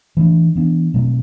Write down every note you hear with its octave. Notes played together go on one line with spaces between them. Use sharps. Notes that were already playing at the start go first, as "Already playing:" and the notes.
E3 A3 D4
E3 B3 D4
B2 F#3 A3 C4